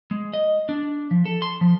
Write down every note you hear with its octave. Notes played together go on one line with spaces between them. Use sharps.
G#3
D#5
D4
F3
A4
C6
F3